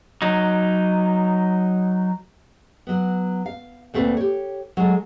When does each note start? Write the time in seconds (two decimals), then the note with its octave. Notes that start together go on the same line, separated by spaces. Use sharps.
0.22 F#3 D#4
2.87 F#3 B3
3.46 F5
3.94 D2 A#2 A3 C4 B4
4.17 G4 C#5
4.77 F#3 G#3 A3